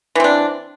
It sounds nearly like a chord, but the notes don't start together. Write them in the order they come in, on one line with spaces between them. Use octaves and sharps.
E3 C4 D4